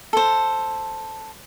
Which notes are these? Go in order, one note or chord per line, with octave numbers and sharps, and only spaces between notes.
A4 C5